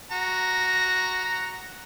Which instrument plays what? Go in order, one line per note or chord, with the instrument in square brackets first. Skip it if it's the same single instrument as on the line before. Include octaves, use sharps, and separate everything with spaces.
[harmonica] F#4 A#5